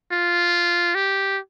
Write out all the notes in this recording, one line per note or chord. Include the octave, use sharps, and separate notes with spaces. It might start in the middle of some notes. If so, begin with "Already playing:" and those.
F4
G4